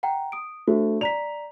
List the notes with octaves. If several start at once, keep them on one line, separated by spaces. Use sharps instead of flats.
F#5 G5 A#5
D#6 D7
A3 D4 F#4 C5
D5 A#5 B6 F7